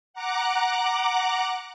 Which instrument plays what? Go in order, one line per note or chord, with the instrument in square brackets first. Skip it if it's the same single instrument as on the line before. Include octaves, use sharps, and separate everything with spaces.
[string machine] F#5 A#5 D6 F#6